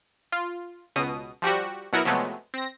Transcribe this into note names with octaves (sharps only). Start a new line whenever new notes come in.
F4
C#2 B2 D#6
F3 G3 F#4 G4
B2 F#3 B3 E4 F#4 A#4
C3 F3 F#3 G#3 A3 B3
C4 A#6